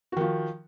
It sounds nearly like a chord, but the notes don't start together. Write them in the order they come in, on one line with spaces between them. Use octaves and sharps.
F#4 D#3 F3